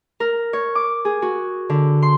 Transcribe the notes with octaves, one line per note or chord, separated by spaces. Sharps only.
A#4
C#5
D6
G#4
F#4
D3
C6